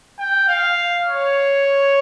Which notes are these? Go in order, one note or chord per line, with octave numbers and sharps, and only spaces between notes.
G5
F5
C#5